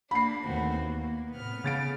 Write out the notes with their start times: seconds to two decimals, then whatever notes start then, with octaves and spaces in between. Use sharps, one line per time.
0.11 A#3 D4 B5 C7
0.45 D#2 A3 B3 C4 F#4
0.77 A#3
1.32 A2 C3 B3 F6
1.64 C#3 A6 D7